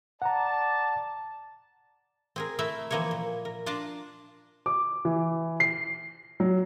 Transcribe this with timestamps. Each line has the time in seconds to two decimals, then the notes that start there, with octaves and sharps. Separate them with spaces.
0.22 D5 F#5 A5 A#5
2.36 C4 G#4 A#4
2.59 A3 E4 A#4 E5
2.91 E3 F3 A#3 A#4 C#5
3.11 A#2
3.45 A#4
3.66 D4 F4 D5 A5 A#5
4.66 D6
5.05 E3
5.60 C7
6.40 F#3